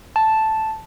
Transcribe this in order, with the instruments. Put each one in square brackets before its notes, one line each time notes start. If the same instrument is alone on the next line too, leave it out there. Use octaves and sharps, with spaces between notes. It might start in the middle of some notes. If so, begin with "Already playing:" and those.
[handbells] A5